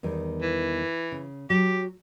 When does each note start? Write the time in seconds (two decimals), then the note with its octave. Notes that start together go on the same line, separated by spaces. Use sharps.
0.03 E2 D#3 G3
0.42 E3
1.12 C#3
1.50 F#3 G4